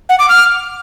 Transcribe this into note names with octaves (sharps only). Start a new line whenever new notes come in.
F#5
D6
F6